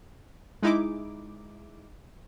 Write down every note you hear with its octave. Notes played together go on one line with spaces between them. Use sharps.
G#3 D#4 E4 D6